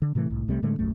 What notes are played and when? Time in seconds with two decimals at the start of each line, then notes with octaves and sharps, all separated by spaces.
0.02 D3
0.15 A2 C3 E3 A3
0.30 C2 A2
0.48 C2 C3 G3 A3
0.62 A2 D3 G#3 A3
0.79 D#1 A#1 F#2 A3